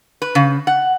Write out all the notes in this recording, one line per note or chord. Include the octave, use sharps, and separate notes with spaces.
B4
C#3
F#5